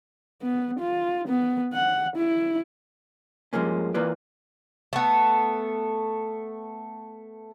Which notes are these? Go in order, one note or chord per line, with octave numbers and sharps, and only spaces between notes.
B3
F4
B3
F#5
E4
G2 F3 G#3 A#3 C#4
E3 A#3 F4 B4 D5
A3 B3